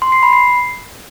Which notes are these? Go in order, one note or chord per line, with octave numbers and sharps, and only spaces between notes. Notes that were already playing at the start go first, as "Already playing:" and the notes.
C6
C7
B5
C7